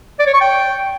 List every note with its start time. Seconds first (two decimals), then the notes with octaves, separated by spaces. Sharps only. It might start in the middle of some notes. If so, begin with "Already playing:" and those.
0.19 D5
0.27 C#5
0.34 C#6
0.41 G5